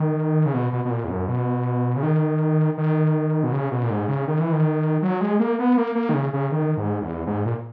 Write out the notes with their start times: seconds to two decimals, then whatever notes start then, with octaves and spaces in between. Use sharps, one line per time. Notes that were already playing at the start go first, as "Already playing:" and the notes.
Already playing: D#3
0.46 C#3
0.54 B2
0.73 B2
0.85 B2
0.91 A#2
1.04 E2
1.10 F#2
1.28 B2
1.96 C#3
2.03 D#3
2.78 D#3
3.43 B2
3.52 C#3
3.71 B2
3.83 A#2
3.90 G#2
4.08 C#3
4.28 D#3
4.40 E3
4.53 D#3
5.02 F#3
5.21 G#3
5.39 A#3
5.59 B3
5.77 A#3
5.95 A#3
6.09 D#3
6.14 C#3
6.33 C#3
6.52 D#3
6.77 G#2
7.02 E2
7.27 G#2
7.45 A#2